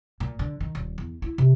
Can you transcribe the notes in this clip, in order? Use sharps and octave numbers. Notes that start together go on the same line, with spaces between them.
A#2
D3
D#3
D#1
E2
E4
C3